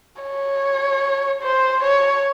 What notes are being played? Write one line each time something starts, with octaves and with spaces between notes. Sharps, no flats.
C#5
C5
C#5